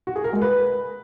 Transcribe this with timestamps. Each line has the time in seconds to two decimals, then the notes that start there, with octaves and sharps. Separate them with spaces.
0.07 F#4
0.16 G#4
0.24 A#4
0.33 G#3
0.42 B4